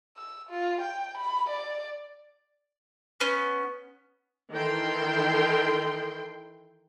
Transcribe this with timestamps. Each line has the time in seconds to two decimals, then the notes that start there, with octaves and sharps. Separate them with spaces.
0.17 E6
0.50 F4
0.81 G5
1.18 B5
1.50 D5
3.20 B3 C#4
4.52 D#3 E3 A4 G5 C6